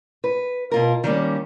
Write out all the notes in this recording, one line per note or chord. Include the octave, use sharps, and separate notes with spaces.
B4
B2 F4 A#4
D#3 G3 A#3 C#4